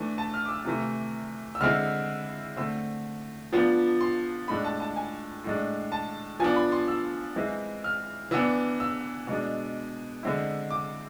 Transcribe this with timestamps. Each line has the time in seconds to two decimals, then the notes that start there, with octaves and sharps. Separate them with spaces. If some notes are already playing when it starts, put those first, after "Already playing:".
Already playing: E3 A3 D4
0.18 A5
0.34 F6
0.46 D6
0.49 E6
0.65 C3 E3 A3
1.55 E6
1.61 D3 G#3 C4 E4 F6
2.56 D3 A3 C4 E6
3.53 F3 B3 D4
4.01 C6
4.48 A2 G#3 D4 B5
4.64 A5
4.80 A5
4.96 G#5
5.44 A2 G#3 D4
5.92 A5
6.40 F3 B3 D4 G#5
6.56 B5
6.72 C6
6.88 E6
7.36 E3 G#3 C4 E4
7.84 F6
8.31 E3 B3 D4 E6
8.80 E6
9.27 B2 G#3 D4
10.23 D3 G#3 C4 E4
10.71 D6